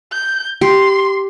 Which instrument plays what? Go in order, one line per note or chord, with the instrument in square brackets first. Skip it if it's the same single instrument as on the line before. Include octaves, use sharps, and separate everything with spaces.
[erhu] G6
[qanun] G4 [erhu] C6